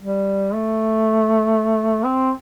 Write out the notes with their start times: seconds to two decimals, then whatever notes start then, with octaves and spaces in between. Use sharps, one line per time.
0.03 G3
0.54 A3
2.04 C4